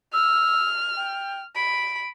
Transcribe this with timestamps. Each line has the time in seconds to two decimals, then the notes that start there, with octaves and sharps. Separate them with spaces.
0.13 E6 F6
0.97 G5
1.56 B5 D7